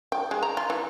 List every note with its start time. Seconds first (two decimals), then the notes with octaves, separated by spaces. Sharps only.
0.12 G5
0.31 G#3
0.43 A#5
0.57 F4
0.70 E3